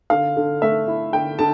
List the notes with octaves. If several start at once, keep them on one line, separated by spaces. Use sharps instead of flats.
D3 F5
D3
A3 E5
E4
D3 G5
D3 A5